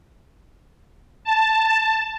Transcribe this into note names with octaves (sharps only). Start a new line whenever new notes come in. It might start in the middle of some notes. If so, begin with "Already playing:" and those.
A5